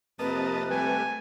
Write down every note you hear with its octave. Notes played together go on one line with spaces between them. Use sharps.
F2 C3 A#3 B4 D#5 A5
G3 A3 G#5